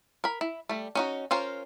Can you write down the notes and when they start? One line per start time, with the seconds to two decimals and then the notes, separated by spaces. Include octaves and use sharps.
0.24 A#4 B5
0.41 E4
0.69 G3 A3
0.95 C#4 D#4 F#4
1.31 C#4 F4 A#4 C5